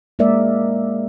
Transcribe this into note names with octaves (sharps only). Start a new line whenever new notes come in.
G#3 A#3 A#4 D5 E5